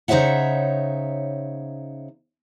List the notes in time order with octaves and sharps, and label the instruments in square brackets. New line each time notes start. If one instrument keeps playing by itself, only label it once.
[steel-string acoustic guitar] C#3 D#4 C5 C#5 E5 F#5